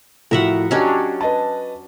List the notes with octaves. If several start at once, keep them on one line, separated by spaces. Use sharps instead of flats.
A2 F3 F#4 A#4 E5 F#5
F#3 C#4 D4 F#4 G4 D#5
B4 D#5 A5